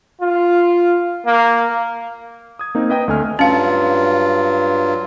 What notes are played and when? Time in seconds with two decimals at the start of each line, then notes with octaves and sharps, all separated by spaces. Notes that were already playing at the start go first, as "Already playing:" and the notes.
0.21 F4
1.26 A#3
2.59 D#6 G#6
2.75 A#3 C4 D#4
2.90 B4 D#5 G5 D#6
3.08 D2 A3 G#5 F6
3.39 G2 F#3 C#4 F4 F5